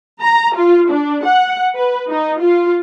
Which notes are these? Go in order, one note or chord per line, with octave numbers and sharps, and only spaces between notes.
A#5
F4
D4
F#5
B4
D#4
F4